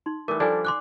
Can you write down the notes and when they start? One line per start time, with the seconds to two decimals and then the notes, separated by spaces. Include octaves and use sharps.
0.06 D#4 C6
0.28 E3 G3 A3 A#4 D6 D#6
0.40 F3 G3 D4 A4 D5 G#5
0.65 C6 D6 F#6